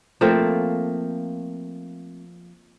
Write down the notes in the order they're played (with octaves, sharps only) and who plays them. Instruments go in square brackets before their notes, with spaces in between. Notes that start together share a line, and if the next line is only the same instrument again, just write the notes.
[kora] F3 A3 A#3 C4